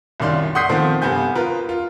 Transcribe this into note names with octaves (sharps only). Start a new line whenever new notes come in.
C2 F#2 D#3 D5 F5 C6
F#5 C6 D#6 G6 B6 C7
D#3 F3 A3 B3 C4
G2 C3 B3 G#5 G6
F4 A#4 B4
F4